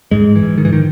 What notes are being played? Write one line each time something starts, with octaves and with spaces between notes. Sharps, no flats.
G#2 G#3
E3
G#2
D#3
E3
D#3